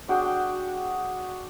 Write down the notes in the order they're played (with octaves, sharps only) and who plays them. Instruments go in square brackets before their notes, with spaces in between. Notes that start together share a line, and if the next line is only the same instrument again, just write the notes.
[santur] D4 F#4 G#4 G5